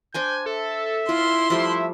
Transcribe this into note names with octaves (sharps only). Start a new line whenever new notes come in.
D4 C5 G5 G#5 G6
A4 E5
E4 F4 C6
F3 G3 A3 E5